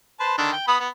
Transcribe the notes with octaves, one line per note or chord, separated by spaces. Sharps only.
B4 C5 A5
D3 D#3 D4
G5
B3 B5 D#6
B3